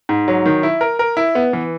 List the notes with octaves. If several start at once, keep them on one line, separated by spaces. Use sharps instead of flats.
G#2
F#3
D#3
E4
A#4
A#4
E4
B3
E3